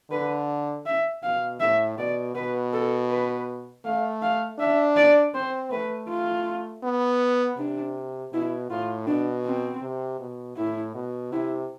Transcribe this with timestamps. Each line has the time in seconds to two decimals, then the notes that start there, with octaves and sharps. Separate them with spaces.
0.11 D3 B4
0.86 E5
1.23 B2 F5
1.60 A2 E5
1.98 B2 D5
2.35 B2 B4
2.73 A4
3.10 B4
3.85 A3 F5
4.22 F5
4.59 D4 E5
4.96 D5
5.34 C4 C5
5.71 A3 B4
6.09 F4
6.84 B3
7.58 C3 D4
8.32 B2 E4
8.70 A2 F4
9.07 B2 D4
9.45 C4
9.82 C3
10.20 B2
10.57 A2 E4
10.95 B2
11.32 C3 E4